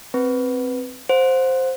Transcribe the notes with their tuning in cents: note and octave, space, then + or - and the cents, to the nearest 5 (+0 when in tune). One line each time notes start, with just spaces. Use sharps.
C4 +0 B4 +0
C5 +0 F#5 -40